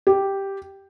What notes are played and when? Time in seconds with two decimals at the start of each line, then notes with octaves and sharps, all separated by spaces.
0.07 G4